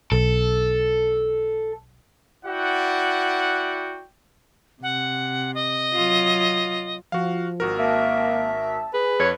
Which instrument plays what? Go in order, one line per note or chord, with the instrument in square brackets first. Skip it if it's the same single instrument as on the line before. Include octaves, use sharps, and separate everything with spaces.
[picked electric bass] B1 [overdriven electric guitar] A4
[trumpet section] E4 F#4 D5 F#5 G5
[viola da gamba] C3 [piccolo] F#5
[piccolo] D#5
[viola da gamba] F#3 F4
[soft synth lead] F3 [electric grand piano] F#4 F5
[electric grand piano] G#1 F#4 A#4
[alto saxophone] A#3 [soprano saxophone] E5 [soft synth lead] A5
[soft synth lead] G#4 [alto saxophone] B4
[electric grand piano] F2 [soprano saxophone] C#5